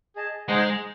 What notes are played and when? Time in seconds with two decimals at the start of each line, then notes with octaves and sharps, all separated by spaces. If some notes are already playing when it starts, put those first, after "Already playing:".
0.16 G#4 D#5 A5
0.48 G#3 D#4 G#4 C5 D#5 F#5